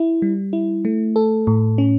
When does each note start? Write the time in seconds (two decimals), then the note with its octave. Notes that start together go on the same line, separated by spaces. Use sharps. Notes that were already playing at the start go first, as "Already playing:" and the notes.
Already playing: E4
0.22 G3
0.53 E4
0.85 A3
1.16 A4
1.47 A2
1.78 C#4